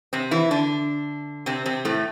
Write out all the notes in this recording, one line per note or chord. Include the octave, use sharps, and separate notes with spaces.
C3 C4
E3 E4
D3 D4
C3 C4
C3 C4
A2 A3